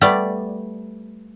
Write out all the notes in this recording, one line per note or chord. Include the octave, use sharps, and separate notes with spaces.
G3 A3 B3 D5